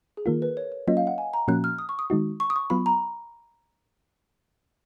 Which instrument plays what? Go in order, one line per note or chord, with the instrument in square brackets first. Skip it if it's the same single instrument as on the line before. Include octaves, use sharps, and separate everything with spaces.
[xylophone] G#4
[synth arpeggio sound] D#3 A#3 F4 [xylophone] A#4
[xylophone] B4
C#5
C#5
[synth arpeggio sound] F#3 A#3 C#4 F4 [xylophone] D#5
[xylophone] F5
F#5
G#5
A#5
[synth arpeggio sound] A#2 F3 A#3 C#4 F#4 [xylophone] F#6
[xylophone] F6
D#6
C#6
D#6
[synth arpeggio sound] D#3 G#3 D#4 F#4
[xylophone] C#6
D#6
C#6
[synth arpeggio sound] F#3 B3 F4 [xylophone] B5
[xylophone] A#5